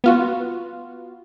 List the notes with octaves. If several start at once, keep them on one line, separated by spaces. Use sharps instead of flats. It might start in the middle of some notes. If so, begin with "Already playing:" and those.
B3 F4 F#4